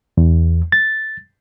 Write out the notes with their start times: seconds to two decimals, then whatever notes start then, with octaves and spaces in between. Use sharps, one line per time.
0.17 E2
0.72 A6